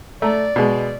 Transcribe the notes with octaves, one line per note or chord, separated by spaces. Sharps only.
A3 D5 A#5
B2 G#3